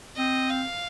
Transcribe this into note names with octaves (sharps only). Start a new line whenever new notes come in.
C4 D#5
F5